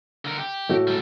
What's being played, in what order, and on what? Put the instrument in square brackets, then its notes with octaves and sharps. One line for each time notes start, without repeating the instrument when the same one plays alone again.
[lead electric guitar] D3 A#4
G4
[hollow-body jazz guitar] A2 A3 F#4
[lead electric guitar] G3 A4